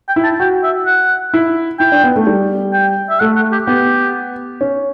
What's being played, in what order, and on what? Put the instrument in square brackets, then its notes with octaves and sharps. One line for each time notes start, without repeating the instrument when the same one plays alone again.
[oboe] G5
[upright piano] E4
[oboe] A5
[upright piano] F#4 [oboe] G5
[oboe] E5
F#5
[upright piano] E4
[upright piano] E4 [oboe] G5
[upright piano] D4
B3
A3
G3
[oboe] G5
E5
[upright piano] A3 [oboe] F#5
[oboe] F#5
G4
[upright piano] B3 [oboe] G4
[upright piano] C#4